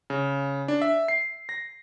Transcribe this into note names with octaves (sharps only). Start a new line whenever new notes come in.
C#3
D4
E5
C7
A#6